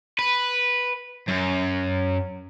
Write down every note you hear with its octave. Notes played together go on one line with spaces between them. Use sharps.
B4
F#2